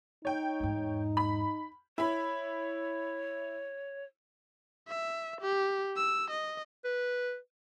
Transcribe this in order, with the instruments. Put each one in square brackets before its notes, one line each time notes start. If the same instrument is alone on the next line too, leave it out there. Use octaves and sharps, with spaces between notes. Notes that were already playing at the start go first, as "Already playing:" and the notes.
[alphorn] D#4 [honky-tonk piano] C#5 G5
[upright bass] E2 G#2
[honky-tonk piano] B5
[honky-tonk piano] E4 B5 [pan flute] C#5
[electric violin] E5
G4
E6
D#5
[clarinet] B4